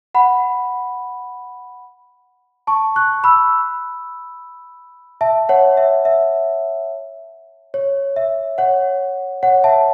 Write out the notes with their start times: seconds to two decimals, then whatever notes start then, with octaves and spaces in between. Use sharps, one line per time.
0.15 F#5 B5
2.67 A5 C#6
2.96 C#6 F#6
3.24 B5 E6
5.21 E5 A5
5.49 C#5 F#5
5.77 E5
6.05 E5
7.74 C#5
8.16 E5
8.58 C#5 F#5
9.43 C#5 F#5
9.64 E5 A5